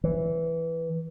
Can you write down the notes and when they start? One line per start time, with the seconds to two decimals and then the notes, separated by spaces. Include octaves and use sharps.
0.04 E3